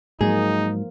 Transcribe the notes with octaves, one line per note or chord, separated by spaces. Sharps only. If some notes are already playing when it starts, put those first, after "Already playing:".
G#2 F3 F#3 A#3 D#4 G#4